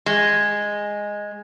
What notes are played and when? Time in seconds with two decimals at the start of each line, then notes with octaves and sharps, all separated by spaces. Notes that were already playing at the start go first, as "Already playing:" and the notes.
0.06 G#3